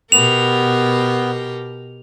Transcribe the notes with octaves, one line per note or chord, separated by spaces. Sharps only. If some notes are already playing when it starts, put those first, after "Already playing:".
B2 B3 G4 A#4 F7